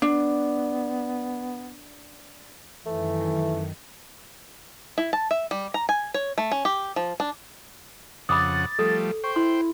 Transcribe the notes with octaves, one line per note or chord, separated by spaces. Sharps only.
B3 D4
F#2 D#3 E3 A3
E4
A5
E5
G3
A#5
G#5
C#5
A3
C#4
G4
F3
D4
F2 C#3 F#5 B5 D6 D#6 A6
F3 G3 A3 A4
C5 G5 C#6
E4 C6